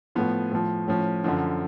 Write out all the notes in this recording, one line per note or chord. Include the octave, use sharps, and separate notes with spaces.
A2 F3 B3
A2 F3
A2 F3 C#4
F#2 D3 F3